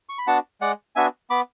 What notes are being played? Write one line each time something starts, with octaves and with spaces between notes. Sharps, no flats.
C#6
B5
B3 D4 F#4 F#5 A5
G#3 D5 F#5
B3 D4 F#4 E5 G#5
B3 B5 D6